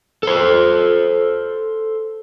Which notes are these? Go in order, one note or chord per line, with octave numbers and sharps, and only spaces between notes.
A4 C5